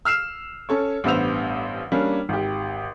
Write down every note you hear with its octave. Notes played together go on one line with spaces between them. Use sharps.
E6 F6 C7 E7
C#4 A4 C#5
A1 G2 B3 C5 E6 F7
G3 A#3 C#4 D4
G#1 G4